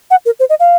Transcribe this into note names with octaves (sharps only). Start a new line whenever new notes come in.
F#5
A#4
C5
D#5
F5